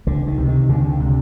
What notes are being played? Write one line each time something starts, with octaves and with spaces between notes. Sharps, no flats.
C#2 D3
D#3
C3
D#3
C#2 D3
C3